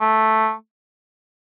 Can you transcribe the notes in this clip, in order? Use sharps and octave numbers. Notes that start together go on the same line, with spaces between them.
A3